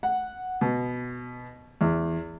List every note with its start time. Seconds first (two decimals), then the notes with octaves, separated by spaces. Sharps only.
0.03 F#5
0.61 B2
1.81 E2